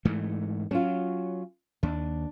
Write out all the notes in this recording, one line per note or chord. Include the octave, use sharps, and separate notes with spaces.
G#2 E3 A3
F#3 C#4 F4
D#2 D4